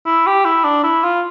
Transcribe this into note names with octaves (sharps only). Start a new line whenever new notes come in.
E4
G4
E4
D4
E4
F4